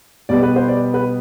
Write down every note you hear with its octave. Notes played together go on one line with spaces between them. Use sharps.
B2 G3 B3 D5
B4
C5
D5
B4